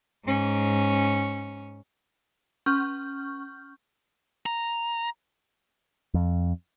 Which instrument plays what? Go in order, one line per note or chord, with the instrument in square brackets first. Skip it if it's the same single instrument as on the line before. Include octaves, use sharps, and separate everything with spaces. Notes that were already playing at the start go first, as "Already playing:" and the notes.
[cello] G#2 C#4
[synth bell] C#4 C#6 F6 G6
[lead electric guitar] A#5
[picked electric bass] F2